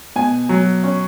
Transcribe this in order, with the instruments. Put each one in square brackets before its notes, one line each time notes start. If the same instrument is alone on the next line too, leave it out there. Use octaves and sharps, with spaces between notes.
[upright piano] B2 G#5
F#3
C#4